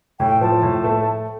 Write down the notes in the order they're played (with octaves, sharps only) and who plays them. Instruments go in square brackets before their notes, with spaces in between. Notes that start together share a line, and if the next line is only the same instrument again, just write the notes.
[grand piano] A2 [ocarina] G5
[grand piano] F3 [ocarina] A5
[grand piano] A2
A3